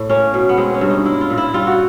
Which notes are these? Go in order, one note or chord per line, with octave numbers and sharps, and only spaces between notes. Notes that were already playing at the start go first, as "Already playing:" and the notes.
Already playing: A2
A#3 C#4
B2
B3
G#3 C4
C#4
G2
D#4
G#3 E4
F4
A#2
E4
G3 F4
F#4